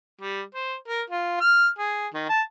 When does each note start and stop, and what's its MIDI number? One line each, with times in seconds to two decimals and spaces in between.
0.21 0.41 55
0.55 0.75 72
0.88 1.02 70
1.10 1.39 65
1.41 1.68 89
1.79 2.07 68
2.14 2.25 51
2.29 2.41 81